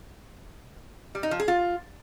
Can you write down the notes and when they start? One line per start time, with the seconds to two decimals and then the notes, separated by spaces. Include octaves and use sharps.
1.15 G3
1.23 D#4
1.31 F3
1.40 G#4
1.48 F4